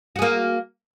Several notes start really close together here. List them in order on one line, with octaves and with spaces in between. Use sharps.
F#4 G#4 A#3